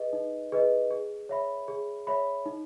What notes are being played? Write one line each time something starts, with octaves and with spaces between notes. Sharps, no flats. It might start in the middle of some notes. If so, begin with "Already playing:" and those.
Already playing: G#4 B4 D#5
D#4
G#4 B4 D#5
G#4
C#5 E5 B5
G#4
C#5 E5 B5
D#4